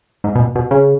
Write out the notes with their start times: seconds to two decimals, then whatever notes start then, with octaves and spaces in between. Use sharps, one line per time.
0.24 G#2
0.35 B2
0.40 A#2
0.55 B2
0.71 C#3